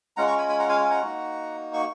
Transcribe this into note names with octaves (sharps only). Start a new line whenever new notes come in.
G#3 C#4 F4 F#5 A#5
A#5 C#6
G#5 B5
G#5 B5
F#5 A#5
F5 G#5
G#5
F#5 A#5
A#3 D#4 F#4
C#6